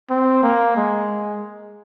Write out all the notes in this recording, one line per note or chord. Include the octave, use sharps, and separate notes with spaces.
C4
A#3
G#3